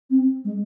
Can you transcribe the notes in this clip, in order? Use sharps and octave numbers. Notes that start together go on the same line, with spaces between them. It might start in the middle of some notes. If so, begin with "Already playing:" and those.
C4
G#3